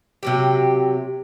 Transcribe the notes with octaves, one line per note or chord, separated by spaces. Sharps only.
C3 F#3 G4